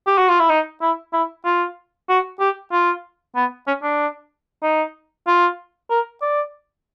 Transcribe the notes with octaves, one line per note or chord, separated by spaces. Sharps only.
G4
F#4
F4
E4
D#4
E4
E4
F4
F#4
G4
F4
B3
C#4
D4
D#4
F4
A#4
D5